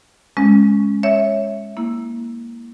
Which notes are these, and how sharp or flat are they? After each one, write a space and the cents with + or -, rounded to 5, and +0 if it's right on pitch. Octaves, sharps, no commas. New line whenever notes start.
G#3 +0 C#4 +0
C#5 +0 E5 +0
A#3 +5 E4 +0